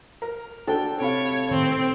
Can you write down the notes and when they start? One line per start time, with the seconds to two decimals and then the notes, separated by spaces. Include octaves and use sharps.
0.22 A#4
0.67 D4 F#4 A4 C5 G5
1.00 C3 C#5 F5 B5 D7
1.50 A2 D#3 C4